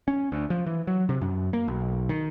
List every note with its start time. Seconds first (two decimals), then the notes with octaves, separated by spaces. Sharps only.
0.08 C#4
0.32 D2
0.50 F3
0.67 E3
0.87 F#3
1.09 C3
1.21 F#2
1.53 A#3
1.68 B1
2.09 D#3